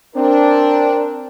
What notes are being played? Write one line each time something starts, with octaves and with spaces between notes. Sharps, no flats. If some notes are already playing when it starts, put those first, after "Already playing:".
C4 D4 A#4